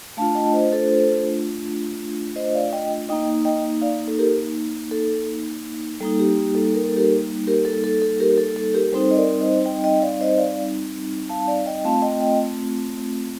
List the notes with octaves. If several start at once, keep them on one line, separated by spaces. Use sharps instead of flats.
A3 D4 F4 F5 A5
A5
D#5 G5
C5 D#5
A4 C5
C5 D#5
D5 F5
D#5 G5
A#3 D#4 D#5 G5
D#5 G5
D5 F5
A4
G4 A#4
A4
G3 A#3 D#4 A4
G4
G4
A4
A#4
A4
G4 A#4
G4 A#4
A4
A4
A4
G4 A#4
A4
A4
G4 A#4
G3 C4 D#4 A4 C5
D#5
A#4 D5
C5 D#5
D#5 G5
D#5 G5
D5 F5
C5 D#5
D5 F5
F5 A5
D5 F5
D#5 G5
A3 C4 F4 F5 A5
D#5 G5
D#5 G5